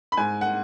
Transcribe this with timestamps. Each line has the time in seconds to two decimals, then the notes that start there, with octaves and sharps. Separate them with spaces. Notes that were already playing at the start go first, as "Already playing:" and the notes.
0.12 B5
0.17 G#2 G#5
0.41 F#5